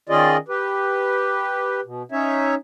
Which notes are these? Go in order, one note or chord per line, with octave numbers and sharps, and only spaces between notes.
D#3 C#4 F4 G#4 D5 D#5
G4 B4
B2
C#4 D#4 C#5 E5